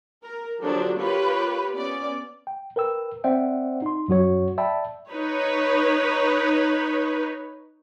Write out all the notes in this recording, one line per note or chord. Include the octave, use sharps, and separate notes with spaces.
A#4
D3 F3 F#3 D4 G4 A4
F4 G4 A#4 B4 C#5
B3 C#4 D5
G5
A#4 B4 G5 E6
C4 C5 D5 E5 F#5 G5
D#4 C6
F#2 F#3 F#4 C#5
D5 E5 G5 A5 B5
D#4 B4 C#5